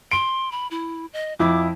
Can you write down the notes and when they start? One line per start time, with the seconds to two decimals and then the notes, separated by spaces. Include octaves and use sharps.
0.11 C6 D7
0.52 B5
0.71 E4
1.13 D#5
1.40 F2 E4 D6